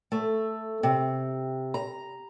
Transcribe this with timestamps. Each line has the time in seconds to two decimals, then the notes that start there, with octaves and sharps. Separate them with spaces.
0.12 A3
0.83 C3
1.74 A#5